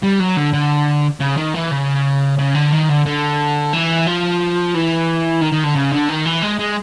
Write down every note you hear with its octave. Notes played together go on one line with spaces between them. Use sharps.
G3
F#3
D3
D3
C#3
D#3
E3
C#3
C#3
D3
D#3
D3
D3
E3
F3
E3
D#3
D#3
D3
C#3
D3
D#3
E3
G#3
G#3